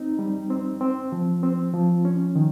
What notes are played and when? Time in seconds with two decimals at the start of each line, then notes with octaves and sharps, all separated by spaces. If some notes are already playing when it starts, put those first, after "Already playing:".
Already playing: C4 D#4
0.19 G3
0.50 C4
0.81 C4
1.12 F3
1.43 C4
1.73 F3
2.05 C#4
2.35 D#3